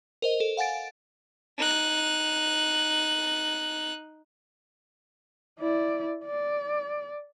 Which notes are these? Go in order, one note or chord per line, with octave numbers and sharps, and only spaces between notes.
A#4 C5 D#5
A4
F5 F#5 G#5 A6 D7
D#4 F#6
E4 D5
D5